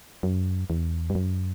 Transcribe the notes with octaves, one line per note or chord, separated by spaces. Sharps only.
F#2
E2
G2
F#2